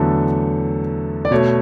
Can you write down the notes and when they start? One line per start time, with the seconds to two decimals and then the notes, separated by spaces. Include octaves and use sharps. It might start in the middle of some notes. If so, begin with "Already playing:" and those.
Already playing: E2 D3 F#3 A3 A4
1.25 D5
1.31 B2 A3 C#5